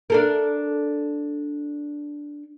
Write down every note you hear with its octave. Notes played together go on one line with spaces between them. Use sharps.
D4 A4 A#4